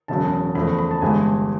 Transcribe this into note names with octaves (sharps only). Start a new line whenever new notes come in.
E1 E2 C#3 F#3 A5
E2 C#3 F3 A3 B5
B5
A5
G1 G2 E3 G#3 G#5